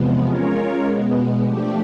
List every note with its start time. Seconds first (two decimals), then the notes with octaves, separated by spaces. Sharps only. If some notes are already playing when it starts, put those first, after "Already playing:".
Already playing: E2 C3 F3 G#3 B3
0.26 G#3 C#4 F4 A#4 C#5
0.85 B2 G#3 B3
1.43 F3 A3 D4 G4